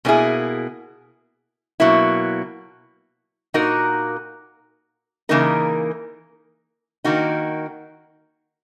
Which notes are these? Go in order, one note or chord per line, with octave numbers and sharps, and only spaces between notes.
B2 A#3 C#4 E4 G#4
B2 F#3 A#3 E4
A#2 A#3 D#4 F#4 A#4
C#3 E3 A#3 D#4 A#4
D#3 A#3 D#4 F#4